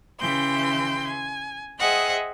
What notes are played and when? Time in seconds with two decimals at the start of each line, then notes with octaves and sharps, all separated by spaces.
0.19 C#3 E3 G5 C6 G6
1.07 G#5
1.77 G#4 C5 D#5 E5 F#5 G5